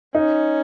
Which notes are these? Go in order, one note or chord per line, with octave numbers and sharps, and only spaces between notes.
C#4 D#4